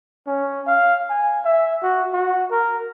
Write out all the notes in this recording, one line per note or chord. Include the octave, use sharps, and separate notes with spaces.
C#4
F5
G#5
E5
F#4
F#4
A#4